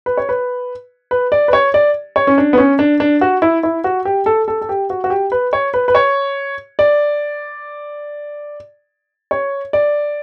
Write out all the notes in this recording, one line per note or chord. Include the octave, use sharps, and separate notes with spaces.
B4
C#5
B4
B4
D5
B4
C#5
D5
C#5
C#4
D4
B3
C#4
D4
D4
F#4
E4
E4
F#4
G4
A4
A4
A4
G4
F#4
F#4
G4
B4
C#5
B4
B4
C#5
D5
C#5
D5